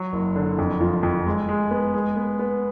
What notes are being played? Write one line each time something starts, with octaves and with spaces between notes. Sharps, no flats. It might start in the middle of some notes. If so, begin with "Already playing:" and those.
Already playing: F#3
F#1
D3
F2
F3
F2
G#3
G#3
B3
G#3
B3
B3